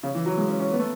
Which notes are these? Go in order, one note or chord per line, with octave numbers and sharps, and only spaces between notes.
C#3
E3
F#3
G#3
C#4
C#4
B3
A3